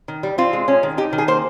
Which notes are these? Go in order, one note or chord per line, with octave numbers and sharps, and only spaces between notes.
D#3
G3
C4 F4
G#3
C#4
D#3
D#4 G4
D#3
G#4
A#3 C5